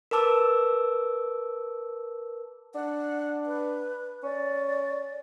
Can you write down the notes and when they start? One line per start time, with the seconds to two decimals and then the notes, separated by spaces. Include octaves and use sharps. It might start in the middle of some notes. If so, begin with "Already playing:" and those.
0.11 A#4 B4 A5 D6 E6
2.75 D4 F#5
3.46 B4
4.23 C#4 D5